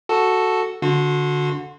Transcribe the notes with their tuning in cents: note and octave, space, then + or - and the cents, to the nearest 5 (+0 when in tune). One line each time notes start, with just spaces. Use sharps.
F#4 +0 A4 +0
D3 -10 F#4 -25 C6 +0